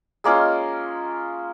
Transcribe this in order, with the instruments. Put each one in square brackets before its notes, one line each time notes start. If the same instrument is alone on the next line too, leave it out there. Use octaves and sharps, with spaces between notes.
[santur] G#3 A#3 C#4 F4